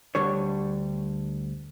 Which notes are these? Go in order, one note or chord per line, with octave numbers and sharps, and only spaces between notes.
D2 D3 G3 D4 C#5